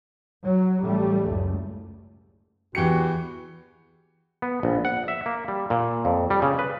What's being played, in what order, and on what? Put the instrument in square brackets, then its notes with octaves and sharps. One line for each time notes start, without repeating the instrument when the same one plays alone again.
[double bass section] F#3
A1 G3 A3
F#1 C#2
[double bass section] E2 [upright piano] E3 G4 C#7 [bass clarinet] F#4
[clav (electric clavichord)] B3
A#1
F#5
E5
A#3
G3
A#2
F2
G3
C#3
B4